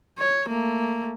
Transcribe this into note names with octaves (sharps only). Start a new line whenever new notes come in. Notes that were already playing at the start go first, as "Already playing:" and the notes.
C#5
A3 A#3